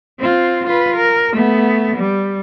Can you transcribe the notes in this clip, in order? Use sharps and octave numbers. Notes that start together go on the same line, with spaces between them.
C4 F4
F4 B4
A#4
A3 B3
G3